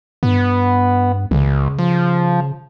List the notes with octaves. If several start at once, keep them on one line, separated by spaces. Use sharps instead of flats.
G2 B3
C#2 C#3
F3